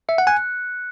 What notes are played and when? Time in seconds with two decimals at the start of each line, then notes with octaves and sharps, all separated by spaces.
0.09 E5 C#7
0.18 F#5
0.27 G#5 F#6